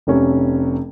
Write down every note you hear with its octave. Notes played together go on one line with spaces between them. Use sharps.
F1 C3 C#4